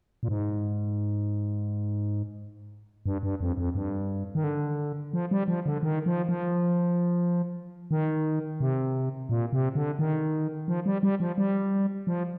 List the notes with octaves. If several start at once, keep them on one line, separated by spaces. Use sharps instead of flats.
A#2
G#2
G2
G2
F2
F2
G2
D#3
D3
F3
G3
F3
D3
D#3
F3
F3
D#3
C3
A#2
C3
D3
D#3
F3
G3
G3
F3
G3
F3